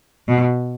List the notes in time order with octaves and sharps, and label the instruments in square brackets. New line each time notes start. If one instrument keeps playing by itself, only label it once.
[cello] B2